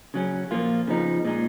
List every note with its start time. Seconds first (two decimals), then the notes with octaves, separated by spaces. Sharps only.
0.14 C#3 F#3 C#4
0.51 A#2 F3 A#3 F4
0.87 C#3 F3 B3 D#4
1.25 A#2 G#3 D#4